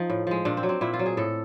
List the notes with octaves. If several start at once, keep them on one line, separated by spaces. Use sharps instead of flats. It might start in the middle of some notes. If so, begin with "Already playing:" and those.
Already playing: F3 D#4
A2
F3 G#3
A#2 D4
C4
F#3
C4
A#2 E4
F4
F#3
G#4
A2 A4